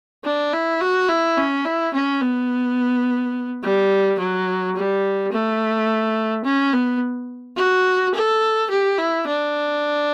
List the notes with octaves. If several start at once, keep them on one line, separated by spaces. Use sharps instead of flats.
D4
E4
F#4
E4
C#4
E4
C#4
B3
G3
F#3
G3
A3
C#4
B3
F#4
A4
G4
E4
D4